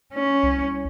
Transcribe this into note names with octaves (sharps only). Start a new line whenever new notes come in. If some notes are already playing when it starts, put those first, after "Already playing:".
C#4
C2